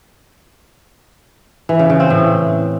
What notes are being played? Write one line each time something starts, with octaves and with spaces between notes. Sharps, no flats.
E3
C#3
C#3
C4
A2